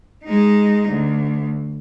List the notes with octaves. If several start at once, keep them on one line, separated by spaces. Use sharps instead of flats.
G#3 D#4
D2